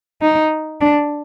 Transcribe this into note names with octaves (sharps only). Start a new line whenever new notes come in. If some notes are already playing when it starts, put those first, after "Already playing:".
D#4
D4